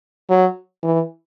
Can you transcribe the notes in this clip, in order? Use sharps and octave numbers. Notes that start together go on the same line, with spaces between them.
F#3
E3